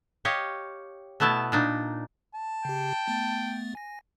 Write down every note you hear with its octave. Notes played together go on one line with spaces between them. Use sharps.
G4 C#5 D#5 F5
B2 A3 B3 E4 A5
A#2 D4 D#4
A5
C#3 G4 G5
A3 B3 A6
G#5 A#6